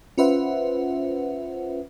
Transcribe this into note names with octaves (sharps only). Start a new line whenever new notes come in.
C#4 F4 B4 C5 E5 F#5